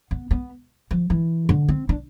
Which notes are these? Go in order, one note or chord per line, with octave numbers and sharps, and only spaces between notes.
B3
B3
F3
E3
D3
C4
D4